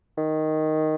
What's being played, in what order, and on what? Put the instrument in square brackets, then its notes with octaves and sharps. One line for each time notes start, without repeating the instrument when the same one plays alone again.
[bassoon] D#3